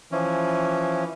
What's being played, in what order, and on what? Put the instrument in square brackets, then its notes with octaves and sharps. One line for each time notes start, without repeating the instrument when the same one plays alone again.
[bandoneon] E3 F3 C#4